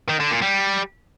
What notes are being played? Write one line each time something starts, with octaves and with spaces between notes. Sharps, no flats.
D#3
D3
A#2
G3